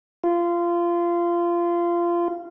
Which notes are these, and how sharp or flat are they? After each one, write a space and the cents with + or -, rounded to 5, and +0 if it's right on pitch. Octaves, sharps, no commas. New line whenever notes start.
F4 -20